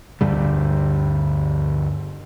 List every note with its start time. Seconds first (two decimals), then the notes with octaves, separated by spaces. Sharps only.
0.21 D2 G2 D3 G3